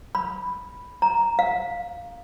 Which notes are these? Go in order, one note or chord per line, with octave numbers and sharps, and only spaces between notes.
B5
A#5
F5